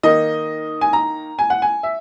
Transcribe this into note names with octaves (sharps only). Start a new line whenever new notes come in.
D#3 A#3 D#4 D#5
G#5
A#5
G#5
F#5
G#5
E5